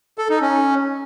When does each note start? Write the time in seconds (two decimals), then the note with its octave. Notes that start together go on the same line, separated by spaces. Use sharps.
0.18 A4
0.30 D#4
0.41 C#4